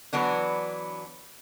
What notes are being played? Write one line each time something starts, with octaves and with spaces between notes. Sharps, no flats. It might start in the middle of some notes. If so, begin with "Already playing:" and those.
E3 F#3 B3 D4